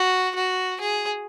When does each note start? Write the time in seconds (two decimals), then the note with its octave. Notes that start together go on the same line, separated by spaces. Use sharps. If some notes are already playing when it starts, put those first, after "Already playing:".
Already playing: F#4
0.35 F#4
0.81 G#4